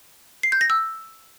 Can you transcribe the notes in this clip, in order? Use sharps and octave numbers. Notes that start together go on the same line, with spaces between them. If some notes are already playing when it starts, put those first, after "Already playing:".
C7
G6
A#6
E6